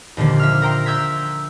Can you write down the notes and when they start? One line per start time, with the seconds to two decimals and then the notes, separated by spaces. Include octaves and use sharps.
0.17 D#2 A#2 D3 F3
0.39 E5 F6
0.62 A#4 G5 A#5 C6
0.86 E5 E6 G6 G#6 B6